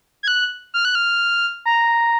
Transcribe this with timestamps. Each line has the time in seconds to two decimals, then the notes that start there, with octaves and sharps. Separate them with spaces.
0.23 G#6
0.28 F#6
0.74 F6
0.85 F#6
0.95 F6
1.66 A#5